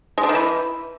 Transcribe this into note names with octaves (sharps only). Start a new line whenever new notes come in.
G#3
D3
D#3
E3